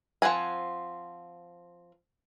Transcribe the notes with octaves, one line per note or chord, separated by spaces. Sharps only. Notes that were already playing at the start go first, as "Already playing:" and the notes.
F3 C4 F#5 G#5